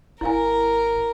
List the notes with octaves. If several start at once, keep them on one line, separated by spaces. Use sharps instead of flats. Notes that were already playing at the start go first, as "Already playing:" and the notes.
G#1 E4 A#4 F5 G#5